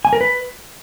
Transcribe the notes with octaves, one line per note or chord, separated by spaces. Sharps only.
G#5
A#4
B4